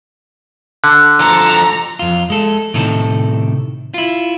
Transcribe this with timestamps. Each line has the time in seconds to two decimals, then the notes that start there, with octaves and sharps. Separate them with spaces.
0.84 D3 F#6
1.20 F3 A4 A#5
1.99 F2 F4
2.30 G#3 A4
2.74 A2 C3 D#3 A4
3.94 E4 F4